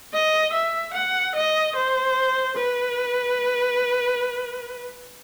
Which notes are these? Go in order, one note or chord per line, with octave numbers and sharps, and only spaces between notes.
D#5
E5
F#5
D#5
C5
B4